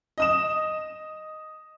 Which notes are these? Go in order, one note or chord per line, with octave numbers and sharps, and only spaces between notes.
D#5 D#6 E7